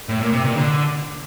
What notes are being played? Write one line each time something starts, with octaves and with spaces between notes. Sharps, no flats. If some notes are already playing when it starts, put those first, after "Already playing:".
A2
A#2
C3
A#2
D3